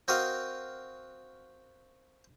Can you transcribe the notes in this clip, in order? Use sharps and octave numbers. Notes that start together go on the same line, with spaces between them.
C4 F#4 A#4 D#5 F5